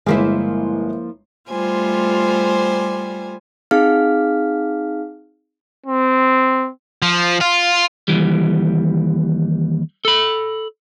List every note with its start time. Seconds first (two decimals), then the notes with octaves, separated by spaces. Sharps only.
0.06 G1 F3 G#3 A#3 E4
1.49 G3 A3 F4 C5 G#5
3.71 C4 D#4 G#4 F5 F6
5.86 C4
7.02 F3
7.41 F4
8.08 D#2 G#2 E3 G3
10.05 A4 B5